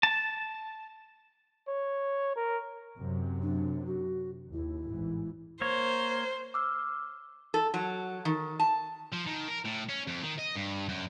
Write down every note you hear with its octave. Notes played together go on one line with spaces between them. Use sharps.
A5
C#5
A#4
F#2 C3 F#3
D4
F#4
D#2 E4
A1 G#2 E3
A#3 C5 C#5
D6 E6 F6
A4
F#3
D#3
A5
F3
D#3
A#4
A2
C#4
F2
D#3
D#5
G2
F#2